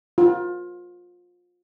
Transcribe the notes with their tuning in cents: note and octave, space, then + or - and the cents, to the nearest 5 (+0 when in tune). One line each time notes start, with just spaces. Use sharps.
F4 +25